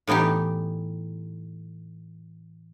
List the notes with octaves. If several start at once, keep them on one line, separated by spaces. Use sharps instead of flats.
A2 E3 B3 D#4 G4